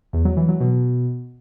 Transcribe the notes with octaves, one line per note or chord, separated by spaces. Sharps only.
E2
F#3
E3
F#3
B2